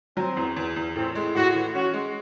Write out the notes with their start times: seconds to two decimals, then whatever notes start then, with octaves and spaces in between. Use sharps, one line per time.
0.17 F#3 C4
0.37 E2
0.56 E2
0.76 E2
0.96 A2 C4
1.15 G#3
1.35 A2 F#4
1.54 E3
1.75 C#4 F#4
1.93 G#3